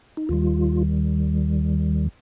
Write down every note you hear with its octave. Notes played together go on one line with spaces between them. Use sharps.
D#4
D#2 D#3 G3 F4